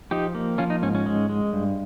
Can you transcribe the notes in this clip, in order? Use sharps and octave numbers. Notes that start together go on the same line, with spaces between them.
F3 D#4 G4
A#3
F3 C#4 F4
D#4
G#2 C#4
C#4
G#3
G#3
G2